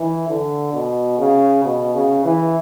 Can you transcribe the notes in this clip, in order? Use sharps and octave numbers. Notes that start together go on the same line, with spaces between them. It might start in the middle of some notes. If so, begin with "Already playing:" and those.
Already playing: E3
D3
B2
C#3
B2
C#3
E3